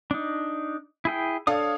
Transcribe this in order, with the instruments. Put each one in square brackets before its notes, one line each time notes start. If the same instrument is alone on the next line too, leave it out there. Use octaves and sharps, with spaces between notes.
[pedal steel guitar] D4 D#4
E4 G#4 G5
[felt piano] D4 A4 F5 [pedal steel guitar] C#5 D#6